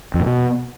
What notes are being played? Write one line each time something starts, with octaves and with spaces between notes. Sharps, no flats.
F2
A#2
B2